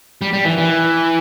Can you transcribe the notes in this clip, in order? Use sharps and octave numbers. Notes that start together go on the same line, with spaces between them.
G3
G3
E3
E3